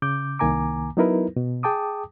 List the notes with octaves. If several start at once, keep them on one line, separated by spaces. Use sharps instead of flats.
C#3 D6 G6
C2 D#3 A#3 G#5 A#5 D6
F#3 B3 D#4 E4 A#4 B4
B2
G#4 G5 A5 D6 D#6